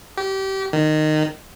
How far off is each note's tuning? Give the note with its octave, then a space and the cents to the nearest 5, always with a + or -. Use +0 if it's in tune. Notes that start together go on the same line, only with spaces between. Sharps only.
G4 -25
D#3 -15